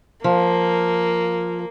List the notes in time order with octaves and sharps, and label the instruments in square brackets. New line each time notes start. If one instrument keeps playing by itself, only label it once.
[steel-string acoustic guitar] F3 [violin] A#3